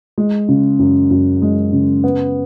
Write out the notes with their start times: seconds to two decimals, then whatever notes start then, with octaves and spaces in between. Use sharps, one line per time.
0.18 G#3
0.49 C#3
0.79 F#2
1.11 F#2
1.42 G#3
1.73 C#3
2.04 B3